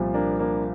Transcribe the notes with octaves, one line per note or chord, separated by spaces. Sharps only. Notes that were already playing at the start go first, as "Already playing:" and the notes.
Already playing: C2 A#2 F3
A#3 D4
A#3 D4